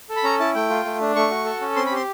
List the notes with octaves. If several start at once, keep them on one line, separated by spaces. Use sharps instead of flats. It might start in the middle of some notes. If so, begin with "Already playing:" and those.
A4
B5
C#4 A#5
E4 A5
A3 G5
F4
A3
D4
A3 C#6
F#4
A4
C#4
C4 C6
B5
G4 C6